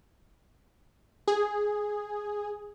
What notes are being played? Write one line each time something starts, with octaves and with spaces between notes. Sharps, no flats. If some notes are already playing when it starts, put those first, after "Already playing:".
G#4